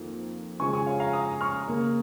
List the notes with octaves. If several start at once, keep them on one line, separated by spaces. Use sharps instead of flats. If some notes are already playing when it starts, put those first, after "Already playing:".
Already playing: F2 D#3 A#3
C#3 F3 G#3 G#5 C#6
G#5 C#6
C#5 F5
F5 A#5
A#5 D#6
C#6 F6
C#3 A#3